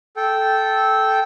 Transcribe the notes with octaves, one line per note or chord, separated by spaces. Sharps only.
A4 G5